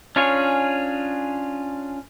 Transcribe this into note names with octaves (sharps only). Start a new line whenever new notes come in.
C#4 D4 F4 G#4 C#5